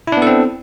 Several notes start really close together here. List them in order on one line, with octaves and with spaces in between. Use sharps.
E4 D4 B3 A4 C4